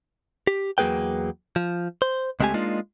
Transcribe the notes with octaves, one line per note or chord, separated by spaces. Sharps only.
G4
E2 F#3 A#3 G#4 B4 G5
F3
C5
C#2 G#3 A3 C4 G4 G#5
G#3 A#3 D4 D#4 F4